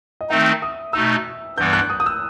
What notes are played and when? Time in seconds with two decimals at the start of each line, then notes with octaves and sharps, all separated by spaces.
0.21 D#5
0.30 D#3 A3 C4 D#4 E5
0.62 D#6
0.93 B2 A3 D#4 E6
1.58 G2 E3 G3 B3 G6
1.73 F#6
1.90 D#6
2.00 D#6
2.06 E6